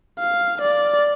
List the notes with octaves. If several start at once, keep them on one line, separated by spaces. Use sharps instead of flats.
F5
D5